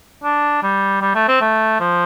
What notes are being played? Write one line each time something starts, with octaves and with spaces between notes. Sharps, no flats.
D4
G3
G3
A3
C4
A3
F3